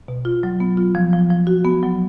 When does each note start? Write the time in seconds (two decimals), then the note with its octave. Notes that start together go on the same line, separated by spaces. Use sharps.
0.08 B2
0.25 F4
0.43 F#3
0.60 B3
0.77 F4
0.95 F3
1.13 F3
1.30 F3
1.47 F#4
1.65 B3
1.83 F#3